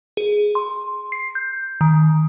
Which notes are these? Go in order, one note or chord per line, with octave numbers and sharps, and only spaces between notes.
G#4
C6
C7
G6
D#3